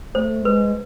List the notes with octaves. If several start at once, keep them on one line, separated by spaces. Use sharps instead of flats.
A3 C5
G#3 B4